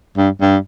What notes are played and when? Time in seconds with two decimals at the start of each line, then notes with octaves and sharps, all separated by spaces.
0.18 G2
0.41 G2